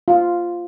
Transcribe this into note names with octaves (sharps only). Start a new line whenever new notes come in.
F4